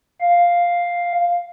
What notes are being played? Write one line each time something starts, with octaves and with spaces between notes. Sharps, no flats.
F5